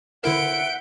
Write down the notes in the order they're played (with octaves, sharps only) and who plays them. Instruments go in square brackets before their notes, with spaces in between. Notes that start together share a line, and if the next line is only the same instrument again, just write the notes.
[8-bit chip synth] D3 E4 A#4 [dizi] E5 [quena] F#5 [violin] G6 D7